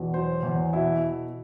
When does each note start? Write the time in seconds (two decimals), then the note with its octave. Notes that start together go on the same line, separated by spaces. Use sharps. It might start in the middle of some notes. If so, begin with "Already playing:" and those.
Already playing: E2 B2
0.14 F#3 C5
0.43 E2
0.73 B2 E4